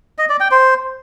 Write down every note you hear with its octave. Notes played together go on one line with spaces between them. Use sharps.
D#5
D5
G5
C5